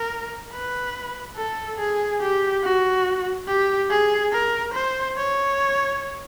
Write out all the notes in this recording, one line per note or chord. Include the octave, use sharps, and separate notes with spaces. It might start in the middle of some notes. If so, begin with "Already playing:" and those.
Already playing: A#4
B4
A4
G#4
G4
F#4
G4
G#4
A#4
C5
C#5